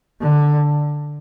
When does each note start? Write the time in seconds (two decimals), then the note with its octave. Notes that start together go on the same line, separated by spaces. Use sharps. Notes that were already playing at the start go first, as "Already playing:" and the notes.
0.21 D3